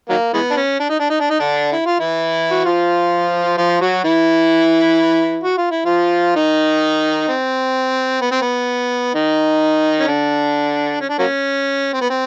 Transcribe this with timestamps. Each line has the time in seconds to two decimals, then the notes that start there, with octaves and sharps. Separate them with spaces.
0.09 D#3 F#3 A#3
0.34 E3 G#3 B3
0.51 D4
0.57 C#4
0.80 D4
0.90 D#4
0.99 D4
1.10 D#4
1.20 D4
1.30 D#4
1.40 D3 D4
1.72 E4
1.86 F4
1.99 E3 E4
2.51 F#4
2.65 F3 F4
3.57 F3 F4
3.81 F#3 F#4
4.04 E3 E4
5.44 F#4
5.58 F4
5.71 E4
5.85 F3 F4
6.36 D#3 D#4
7.28 C4
8.21 B3
8.31 C4
8.41 B3
9.14 D#3 D#4
9.99 C#4
10.07 D3 D4
11.01 C#4
11.09 D4
11.19 F#3 A#3 C#4
11.93 C4
12.01 B3
12.10 C4